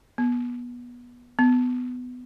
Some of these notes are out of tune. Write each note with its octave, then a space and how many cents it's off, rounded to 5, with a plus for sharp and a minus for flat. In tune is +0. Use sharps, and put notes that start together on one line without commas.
B3 -20
B3 +15